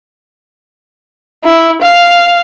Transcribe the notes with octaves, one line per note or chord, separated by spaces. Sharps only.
E4
F5